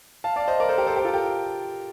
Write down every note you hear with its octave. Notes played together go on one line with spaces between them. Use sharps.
F5 A5
D5 F5
C5 D#5
A#4 D5
A4 C5
G4 A#4
A4 C5
G4 A#4
F4 A4
G4 A#4